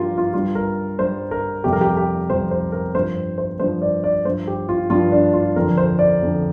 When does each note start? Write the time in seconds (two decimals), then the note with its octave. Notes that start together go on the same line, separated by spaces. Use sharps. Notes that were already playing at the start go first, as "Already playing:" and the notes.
Already playing: G2 F3 F4 G4 A#4
0.18 F4
0.34 G2 G3 F4
0.55 A#4
0.99 G2 G3 C5
1.31 A#4
1.64 F2 C3 G3 G4
1.73 A#4
1.81 G4
1.97 G4
2.30 F2 C3 G3 C5
2.51 C5
2.72 A#4
2.95 G2 F3 C5
3.38 C5
3.60 G2 F3 C5
3.82 D5
4.04 D5
4.25 G2 F3 C5
4.48 G4
4.69 F4
4.90 G2 F3 F4
5.12 D4
5.33 F4
5.56 F2 D3 F3 A#4
5.77 C5
5.99 D5
6.21 F2 D3 F3